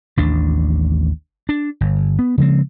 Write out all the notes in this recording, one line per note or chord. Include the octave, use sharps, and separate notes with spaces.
A1 D#2 D4
D4
G1
B3
C#3 F3 G#3 C4